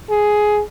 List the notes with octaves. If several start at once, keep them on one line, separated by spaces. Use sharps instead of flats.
G#4